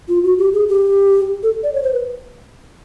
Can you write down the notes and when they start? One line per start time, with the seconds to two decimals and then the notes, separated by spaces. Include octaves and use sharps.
0.08 F4
0.23 F#4
0.38 G4
0.53 G#4
0.68 G4
1.43 A4
1.63 D5
1.73 C#5
1.83 C5
1.93 B4